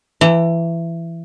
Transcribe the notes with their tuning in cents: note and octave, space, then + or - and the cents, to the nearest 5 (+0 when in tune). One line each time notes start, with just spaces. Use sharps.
E3 +20 A#5 -45